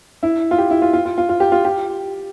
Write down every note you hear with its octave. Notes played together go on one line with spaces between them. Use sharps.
E4
F4
G4
E4
F4
F4
F4
F4
F4
G4
F4
G4